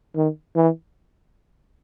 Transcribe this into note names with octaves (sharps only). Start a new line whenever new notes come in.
D#3
E3